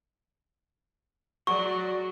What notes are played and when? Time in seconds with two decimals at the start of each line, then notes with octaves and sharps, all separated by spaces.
1.47 F#3 F#4 G#4 D5 C#6